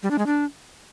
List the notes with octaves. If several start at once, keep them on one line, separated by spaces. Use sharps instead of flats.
G3
D4
G#3
D4